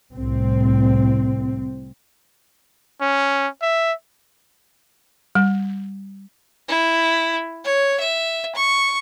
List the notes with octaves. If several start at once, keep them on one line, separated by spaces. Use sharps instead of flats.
C2 A2 C4
C#4
E5
G3
E4
C#5
E5
C#6